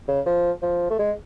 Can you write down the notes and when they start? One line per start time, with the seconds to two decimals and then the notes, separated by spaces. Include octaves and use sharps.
0.08 C#3
0.26 F3
0.62 F3
0.90 A3
0.99 G#3